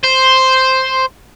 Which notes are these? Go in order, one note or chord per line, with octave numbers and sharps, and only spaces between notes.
C5